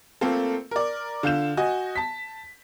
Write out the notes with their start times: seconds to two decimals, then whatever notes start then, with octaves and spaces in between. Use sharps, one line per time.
0.21 A3 A#3 C4 F4 A4
0.71 A#4 D5
1.23 D3 F4 G6 E7
1.57 F#4 D#5 G#5
1.96 A5 B6